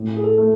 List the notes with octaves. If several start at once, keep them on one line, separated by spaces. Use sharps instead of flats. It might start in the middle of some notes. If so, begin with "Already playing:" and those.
Already playing: A2
G#4
A4
A3